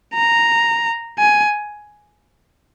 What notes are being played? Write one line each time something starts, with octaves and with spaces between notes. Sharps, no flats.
A#5
G#5